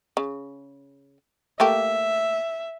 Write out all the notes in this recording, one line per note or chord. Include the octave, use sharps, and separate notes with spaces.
C#3
A3 A#3 G4 E5